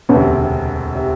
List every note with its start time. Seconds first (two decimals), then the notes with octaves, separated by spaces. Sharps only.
0.09 E1 D2 C3 B3 C#4
0.95 C3